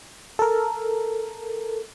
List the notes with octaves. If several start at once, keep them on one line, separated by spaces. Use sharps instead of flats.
A4 A#4